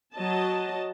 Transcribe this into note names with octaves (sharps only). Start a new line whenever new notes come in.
F#3 D#5 A5